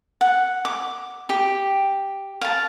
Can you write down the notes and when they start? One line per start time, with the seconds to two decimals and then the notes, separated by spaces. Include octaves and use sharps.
0.21 F#5
0.65 D6
1.29 G4 G5
2.41 F5 A5